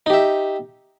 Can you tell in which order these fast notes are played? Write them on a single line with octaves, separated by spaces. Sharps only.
D#4 G4 E5